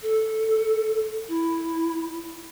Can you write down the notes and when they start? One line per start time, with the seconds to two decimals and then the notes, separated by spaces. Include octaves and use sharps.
0.02 A4
1.28 E4